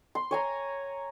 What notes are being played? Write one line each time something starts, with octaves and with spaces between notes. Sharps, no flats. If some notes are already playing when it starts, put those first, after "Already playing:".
C6
C#5 G#5 A#5